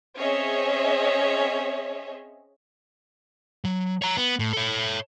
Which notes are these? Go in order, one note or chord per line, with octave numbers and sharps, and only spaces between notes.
C4 C#4 G#4 C#5 D#5 E5
F#3
C#5 A#5
B3
A2
A4 C#5